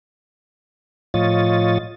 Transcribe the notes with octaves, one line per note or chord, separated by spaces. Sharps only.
A2 F3 F4 C#5 D#5 A6